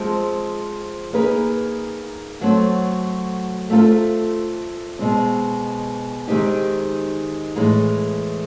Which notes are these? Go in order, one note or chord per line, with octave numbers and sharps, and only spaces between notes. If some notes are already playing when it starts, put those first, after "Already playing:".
Already playing: F3 G#3 C4
A#3 D#4 G#4 B4
F#3 A3 C4
A3 C4 F4 A4
B2 G#3 C4
D#3 G#3 C4 D#4 G4
A2 E3 G#3